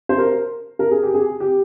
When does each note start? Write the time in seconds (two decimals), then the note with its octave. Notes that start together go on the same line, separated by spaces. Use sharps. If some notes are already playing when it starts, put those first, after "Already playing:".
0.09 C5
0.18 A#4
0.79 A#4
0.91 G#4
1.03 G4
1.14 G#4
1.40 G4